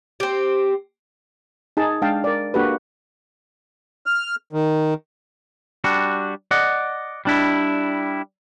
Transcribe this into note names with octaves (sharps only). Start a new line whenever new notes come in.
C4 G4
D#4 G#4 A5
G#3 D4 F5 G5 A5
A#4 D5
A#3 D4 F#4 G4 A4 B4
F6
D#3
G3 D4 F#4
D5 D#5 F#5
G3 D4 E4